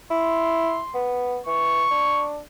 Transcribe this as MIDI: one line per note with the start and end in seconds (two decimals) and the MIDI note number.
0.11 0.80 64
0.11 0.97 84
0.95 1.39 59
1.47 1.86 52
1.47 2.27 85
1.91 2.40 62